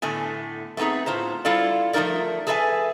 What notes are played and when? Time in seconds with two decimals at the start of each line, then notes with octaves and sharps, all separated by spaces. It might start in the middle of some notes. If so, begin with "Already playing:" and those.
0.02 A2 D3 A3 B3 G#5
0.77 A3 B3 C4 D#4 G#4
1.06 A2 F4 C5 A#5
1.45 G3 E4 F4 A4 D5
1.93 F3 A3 A#3 D#4 A#4 D5
2.47 G#4 A4 B4 D5 E5 G#5